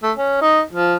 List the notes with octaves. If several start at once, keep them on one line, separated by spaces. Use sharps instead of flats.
A3
C#4
D#4
F3